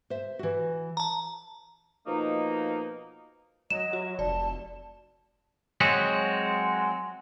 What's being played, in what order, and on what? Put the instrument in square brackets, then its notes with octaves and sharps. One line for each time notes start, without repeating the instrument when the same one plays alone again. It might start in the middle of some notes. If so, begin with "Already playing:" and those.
[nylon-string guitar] C5 E5
E3 F#4
[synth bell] A5 A#5
[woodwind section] B2 F3 A#3 D#4
[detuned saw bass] F#3 [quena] D#5 [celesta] E7
[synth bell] F#4
[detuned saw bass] F1 [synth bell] D5 [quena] A5
[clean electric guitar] F#3 G#3 C4 F#4